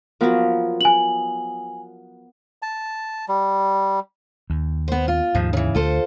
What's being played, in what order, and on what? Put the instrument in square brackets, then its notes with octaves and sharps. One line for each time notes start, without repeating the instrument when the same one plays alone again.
[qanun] F3 F#3 [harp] B3 A#4
[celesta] G#5 F#7
[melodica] A5
G3
[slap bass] D#2
[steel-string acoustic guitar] B3 C5
F4
[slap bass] D#2 G#2 [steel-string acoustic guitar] F3
[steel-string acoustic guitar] C#3 E3
[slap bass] D2 [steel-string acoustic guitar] F4 A4 C5